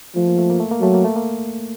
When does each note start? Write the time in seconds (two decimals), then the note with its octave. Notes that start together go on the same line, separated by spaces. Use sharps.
0.16 F3 A3
0.28 A#3
0.38 A3
0.50 A#3
0.60 A3
0.71 A#3
0.81 F#3 A3
0.94 A#3
1.04 A3
1.16 A#3